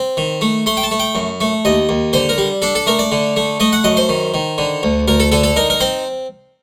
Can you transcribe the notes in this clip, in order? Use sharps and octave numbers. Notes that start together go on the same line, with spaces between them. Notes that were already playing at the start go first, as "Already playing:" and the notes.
Already playing: C4
D#3
A3
A3 C6
G5
A5
A3
G5
F#2
A3
D#2 D#5
D#2
D3 C5
A#4
G3
D4 A4
A4
A3 A#4
D5
D3
A3
A3 D#5
F#5
F#2 D#5
C5
D#3
D#3
D3
D2
D2 A#4
A4
D3 A4
A4
D#4 A#4
A#4
C4 C5